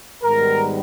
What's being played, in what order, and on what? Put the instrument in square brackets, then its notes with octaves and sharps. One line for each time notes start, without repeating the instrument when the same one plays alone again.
[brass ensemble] G#2 D#3 G3 B3 A#4